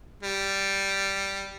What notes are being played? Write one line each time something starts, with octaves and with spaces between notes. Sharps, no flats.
G3